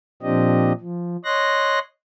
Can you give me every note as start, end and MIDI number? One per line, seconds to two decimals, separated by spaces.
0.23 0.73 46
0.23 0.73 53
0.23 0.73 60
0.23 0.73 62
0.23 0.73 67
0.23 0.73 75
0.80 1.16 53
1.25 1.79 73
1.25 1.79 75
1.25 1.79 84
1.25 1.79 90
1.25 1.79 94